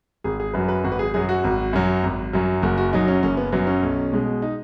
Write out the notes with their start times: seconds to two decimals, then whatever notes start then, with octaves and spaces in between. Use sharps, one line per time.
0.24 G#1 G#4
0.40 G#4
0.53 F#2 F#3 B4
0.68 B4
0.84 G#1 F#4
0.92 B4
0.99 G#4
1.14 F#2 F#3 G#4
1.29 F#4
1.44 G#1
1.73 F#2 F#3
2.03 G#1
2.33 F#2 F#3
2.62 F#1 F#4
2.78 F#4
2.93 F#2 F#3 D#4
3.08 C#4
3.23 F#1 C#4
3.37 B3
3.52 F#2 F#3 B3
3.67 C#4
3.83 B1
4.13 B2 G#3
4.42 D#4